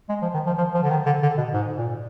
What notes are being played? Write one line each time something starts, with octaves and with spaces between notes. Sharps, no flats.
G#3
F3
D#3
F3
F3
F3
D3
D#3
D3
D3
B2
G#2
A#2